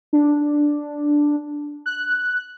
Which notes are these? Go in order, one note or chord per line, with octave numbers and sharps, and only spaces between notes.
D4
F#6